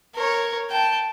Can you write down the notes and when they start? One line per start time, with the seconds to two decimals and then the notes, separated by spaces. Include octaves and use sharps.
0.15 A#4 C#5
0.70 G5 A5